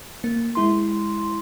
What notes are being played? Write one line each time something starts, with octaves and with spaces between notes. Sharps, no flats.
A#3
G#3 E4 C6